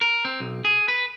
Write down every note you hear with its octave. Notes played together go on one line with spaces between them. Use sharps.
A#4
C4
B1
G#4
B4